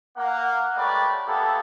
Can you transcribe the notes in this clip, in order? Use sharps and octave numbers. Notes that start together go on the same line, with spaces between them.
A#3 F#5
G#3 A3 G4 B4 C#5 D5
A#3 B3 E4 G4 A4